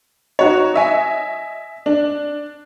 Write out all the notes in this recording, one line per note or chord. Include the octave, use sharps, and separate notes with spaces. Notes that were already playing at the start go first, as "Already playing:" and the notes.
D#4 F#4 C#5
D#5 E5 G#5
D4